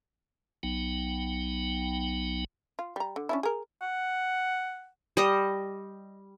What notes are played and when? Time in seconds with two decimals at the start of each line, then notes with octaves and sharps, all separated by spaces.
0.63 B1 F#3 B3 D#4 G5
2.79 F4
2.96 G3 A#5
3.16 D3
3.29 C#4 D4 E4
3.43 G#4 A#4
3.81 F#5
5.17 G3 D#5